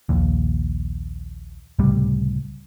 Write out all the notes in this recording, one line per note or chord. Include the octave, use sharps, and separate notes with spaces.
A#1 D#2
C#2 A2 C3 G3